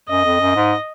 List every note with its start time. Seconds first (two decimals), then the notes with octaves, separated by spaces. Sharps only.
0.09 F#2 D#5
0.25 F2
0.40 F#2
0.56 G#2